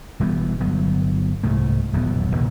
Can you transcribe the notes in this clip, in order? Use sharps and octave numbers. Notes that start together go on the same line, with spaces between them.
E1 E3 G3 B3
G1 F#3 B3
C2 G#2 A3
D#1 B1 E2 B3
C2 A#2 D#3